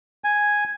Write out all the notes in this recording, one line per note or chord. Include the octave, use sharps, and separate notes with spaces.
G#5